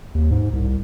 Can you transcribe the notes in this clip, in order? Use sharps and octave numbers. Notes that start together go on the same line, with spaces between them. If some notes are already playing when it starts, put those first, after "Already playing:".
D#2
G#2
C2